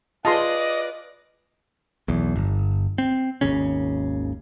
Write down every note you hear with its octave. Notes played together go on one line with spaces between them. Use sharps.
F4 G#4 B4 D5 D#5 A5 C6
B1 E2
G1
C4
G#1 D#2 C#3 C#4